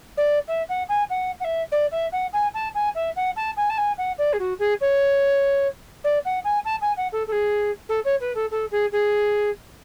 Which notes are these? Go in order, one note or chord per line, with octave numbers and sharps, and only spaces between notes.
D5
E5
F#5
G#5
F#5
F#5
E5
D5
E5
F#5
G#5
A5
G#5
E5
F#5
A5
G#5
A5
G#5
F#5
D5
G#4
F#4
G#4
C#5
D5
F#5
G#5
A5
G#5
F#5
A4
A4
G#4
A4
C#5
B4
A4
A4
G#4
G#4